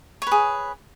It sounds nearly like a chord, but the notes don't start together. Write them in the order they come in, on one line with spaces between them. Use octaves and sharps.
C#5 B4 G#4